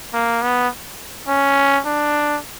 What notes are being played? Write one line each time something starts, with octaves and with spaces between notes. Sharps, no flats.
A#3
B3
C#4
D4